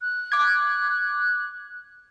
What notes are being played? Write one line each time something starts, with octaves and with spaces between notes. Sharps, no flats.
F#6
D6 G#6